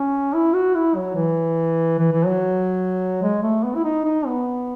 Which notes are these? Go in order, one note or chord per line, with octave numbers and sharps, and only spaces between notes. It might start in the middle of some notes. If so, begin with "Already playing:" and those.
Already playing: C#4
E4
F#4
E4
F#3
E3
E3
E3
F#3
G#3
A3
B3
E4
D#4
D#4
B3